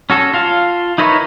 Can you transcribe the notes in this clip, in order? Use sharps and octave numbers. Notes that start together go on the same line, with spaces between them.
C#4 F#4 A4
F4 F5 A5
D#4 E4 A#4 B4 C#5